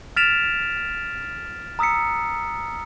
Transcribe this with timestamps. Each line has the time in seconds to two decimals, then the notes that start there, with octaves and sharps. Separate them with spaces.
0.17 F6 A6 B6 D7 E7 F7
1.79 A#5 D#6 E6 B6 C#7